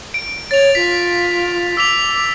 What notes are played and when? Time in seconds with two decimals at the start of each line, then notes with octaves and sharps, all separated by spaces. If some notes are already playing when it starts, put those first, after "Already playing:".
0.14 D7
0.51 C#5 A6 F7
0.75 F4 B6
1.77 D6 E6 B6 F7